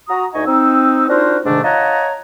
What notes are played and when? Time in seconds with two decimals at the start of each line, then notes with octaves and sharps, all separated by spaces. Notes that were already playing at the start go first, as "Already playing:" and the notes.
0.09 F#4 A#5 D#6
0.34 D2 D#4 D#5 G#5 C#6
0.46 C4 D#4 E6
1.09 D4 D#4 F4 F#4 A#4 C5
1.46 G#2 C3 D#3 A3 D4
1.63 F4 C#5 D#5 F#5 A5 A#5